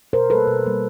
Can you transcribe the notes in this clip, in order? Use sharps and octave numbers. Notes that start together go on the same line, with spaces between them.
B2 A#4 C5
G3 A#3 A4 B4
B2
G3 A#3